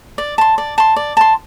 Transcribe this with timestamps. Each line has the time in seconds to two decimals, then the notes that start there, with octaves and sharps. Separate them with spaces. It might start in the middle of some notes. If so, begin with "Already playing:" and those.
0.18 D5
0.38 A5 C6
0.58 D5
0.78 A5 C6
0.96 D5
1.17 A5 C6